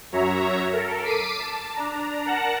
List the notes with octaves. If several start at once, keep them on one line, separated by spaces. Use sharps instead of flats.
F#2 F#3 C#5 E5 A#5
A4 A#4
D6 B6 C7 D7 D#7
A5
D4 A#5
A#4 F#5 A5 F#6 A#6